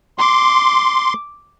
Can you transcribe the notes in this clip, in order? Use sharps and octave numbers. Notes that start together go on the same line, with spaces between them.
C6 D6